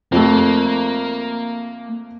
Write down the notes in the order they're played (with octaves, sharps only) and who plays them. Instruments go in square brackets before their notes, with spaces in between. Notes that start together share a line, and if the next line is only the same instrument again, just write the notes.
[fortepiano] F2 A3 [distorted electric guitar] A#3